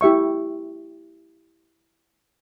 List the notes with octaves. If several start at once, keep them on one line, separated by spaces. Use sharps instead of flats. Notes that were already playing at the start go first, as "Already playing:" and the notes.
E4 G4 E5 C#6